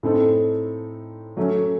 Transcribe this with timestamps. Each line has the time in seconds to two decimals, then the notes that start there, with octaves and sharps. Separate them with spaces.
0.03 A2 A3 C4 D#4 A4
1.37 F#3 A3 C#4